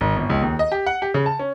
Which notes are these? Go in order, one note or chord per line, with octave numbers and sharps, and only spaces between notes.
G#1
G1
C#2
D#2
D#5
G4
F#5
G4
C#3
A5
C#4